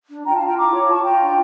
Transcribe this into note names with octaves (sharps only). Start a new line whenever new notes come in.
D4
F4 G5 A#5
F5 A5
F4 G5 A#5
E4 A#5 D6
C#5
F4 A5 C#6
F4 G5 A#5
D4